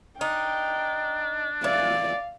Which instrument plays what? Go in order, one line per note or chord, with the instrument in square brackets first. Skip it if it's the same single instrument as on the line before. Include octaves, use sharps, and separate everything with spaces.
[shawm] D4 [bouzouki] D#4 [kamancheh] G5
[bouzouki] E3 [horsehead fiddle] D5 [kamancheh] F5